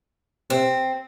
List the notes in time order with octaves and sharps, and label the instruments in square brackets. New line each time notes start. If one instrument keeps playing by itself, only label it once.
[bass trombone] C3 [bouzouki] C4